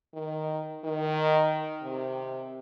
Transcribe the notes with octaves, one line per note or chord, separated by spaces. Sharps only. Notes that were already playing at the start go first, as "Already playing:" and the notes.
D#3
D#3
C3